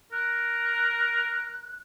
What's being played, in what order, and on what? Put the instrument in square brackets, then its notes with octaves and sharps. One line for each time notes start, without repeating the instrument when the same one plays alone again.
[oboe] A#4 [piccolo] F#6